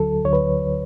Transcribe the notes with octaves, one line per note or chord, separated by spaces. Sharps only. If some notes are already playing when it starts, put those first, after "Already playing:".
Already playing: D2 D3 F#3 A4
D2 D3 F#3 C#5
B4